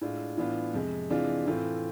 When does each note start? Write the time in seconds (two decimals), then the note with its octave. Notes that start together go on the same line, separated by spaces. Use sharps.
0.01 A2 G#3 D4 F4
0.38 A2 E3 B3 D4 F4
0.74 F2 C3 G#3
1.10 C3 E3 G#3 D4 F4
1.46 A2 E3 A3 C4 F4